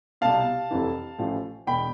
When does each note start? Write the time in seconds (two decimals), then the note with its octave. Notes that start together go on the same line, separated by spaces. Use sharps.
0.21 C2 B2 F5 A5
0.71 F1 F2 C3 E3
1.19 A1 A2 F3
1.67 E1 E2 B2 G5 B5